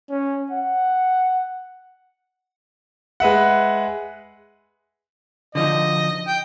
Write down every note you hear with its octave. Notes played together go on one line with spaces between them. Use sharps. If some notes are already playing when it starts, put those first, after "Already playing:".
C#4
F#5
G#3 B4 E5 F#5
D3 F3 D#4 D#5
G5